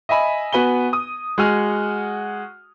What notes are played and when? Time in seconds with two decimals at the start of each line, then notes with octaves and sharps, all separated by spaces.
0.09 D#5 E5 G#5 B5
0.52 B3 F#4 B4 G#5 G7
0.93 D#6
1.38 G#3 F#4 F#5 G#5 F6